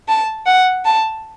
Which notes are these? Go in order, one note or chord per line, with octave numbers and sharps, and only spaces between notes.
A5
F#5
A5